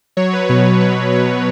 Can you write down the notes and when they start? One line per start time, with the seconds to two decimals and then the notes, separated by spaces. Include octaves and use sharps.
0.17 F#3 C#5
0.33 B4
0.49 B2 C#5
0.65 B4
0.80 F#3 B4
1.12 F#3 C#5